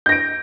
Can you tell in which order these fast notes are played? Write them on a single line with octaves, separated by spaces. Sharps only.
G6 A#6 D7